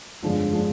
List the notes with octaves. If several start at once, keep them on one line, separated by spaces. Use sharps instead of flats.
G1 F2 D3 F3 G#3
D3 F3 G#3